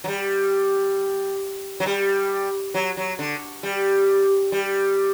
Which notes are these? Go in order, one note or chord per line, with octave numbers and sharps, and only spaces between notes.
F#3
G3
F#3
G3
F#3
F#3
D3
G3
G3